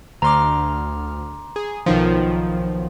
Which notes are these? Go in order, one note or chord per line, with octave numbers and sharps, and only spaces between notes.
D2 A#5 C6 D6 F6
G#4
B1 D#3 F3